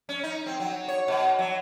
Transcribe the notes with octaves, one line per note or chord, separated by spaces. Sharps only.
C#4
D#4
C4
F#3
C#5
B2
F#3